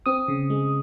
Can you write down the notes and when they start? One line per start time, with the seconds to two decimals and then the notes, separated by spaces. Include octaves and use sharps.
0.06 C4 D#6
0.28 C#3
0.50 G#3